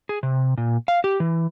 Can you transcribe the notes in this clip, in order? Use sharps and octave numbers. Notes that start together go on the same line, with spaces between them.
G#4
C3
A#2
F5
G4
E3